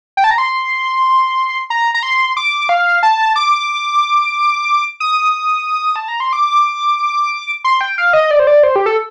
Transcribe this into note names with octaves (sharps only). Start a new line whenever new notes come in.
G5
A5
A#5
C6
A#5
A#5
C6
D6
F5
A5
D6
D#6
A5
A#5
C6
D6
C6
G5
F5
D#5
D5
C5
D5
C5
G4
A4